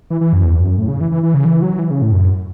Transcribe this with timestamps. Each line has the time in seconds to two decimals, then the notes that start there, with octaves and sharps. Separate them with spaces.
0.10 E3
0.21 E3
0.33 F#2
0.44 E2
0.60 F#2
0.78 A2
0.88 C#3
1.01 E3
1.12 E3
1.23 E3
1.34 C#3
1.45 E3
1.62 F#3
1.79 E3
1.90 C#3
2.02 A2
2.12 F#2